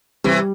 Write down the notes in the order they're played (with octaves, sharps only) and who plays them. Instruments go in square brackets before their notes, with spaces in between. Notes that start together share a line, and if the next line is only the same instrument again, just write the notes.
[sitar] C3 E3 [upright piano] G3